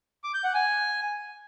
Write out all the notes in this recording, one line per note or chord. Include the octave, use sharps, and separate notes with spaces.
D6
G6
F#5
G#5